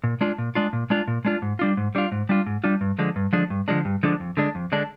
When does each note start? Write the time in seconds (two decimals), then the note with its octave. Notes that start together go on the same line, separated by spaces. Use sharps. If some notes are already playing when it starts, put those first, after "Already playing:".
0.04 A#2
0.21 G#3 D4 F4
0.38 A#2
0.55 G#3 D4 F4
0.73 A#2
0.90 G#3 D4 F4
1.08 A#2
1.25 G#3 D4 F4
1.42 G#2
1.59 G3 D4 F4
1.77 G#2
1.95 G3 D4 F4
2.12 G#2
2.29 G3 D4 F4
2.46 G#2
2.64 G3 D4 F4
2.81 G2
2.98 D3 F3 G#3 D4
3.16 G2
3.33 D3 F3 G#3 D4
3.50 G2
3.68 D3 F3 G#3 D4
3.85 G2
4.03 D3 F3 G#3 D4
4.20 F2
4.37 D3 G#3 D4
4.55 F2
4.72 D3 G#3 D4